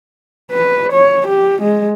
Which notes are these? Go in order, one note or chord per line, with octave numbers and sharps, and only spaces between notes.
B4
C#5
G4
G#3